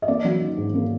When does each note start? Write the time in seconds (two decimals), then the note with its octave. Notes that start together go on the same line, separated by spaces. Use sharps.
0.02 D#5
0.08 A#3 D5
0.25 F#3
0.41 D#3
0.57 G#2
0.75 A#3